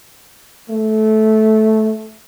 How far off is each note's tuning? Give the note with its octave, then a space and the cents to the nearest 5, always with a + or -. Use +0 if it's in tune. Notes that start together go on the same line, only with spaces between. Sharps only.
A3 -15